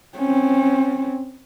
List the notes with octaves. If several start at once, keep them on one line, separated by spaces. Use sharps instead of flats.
C4 C#4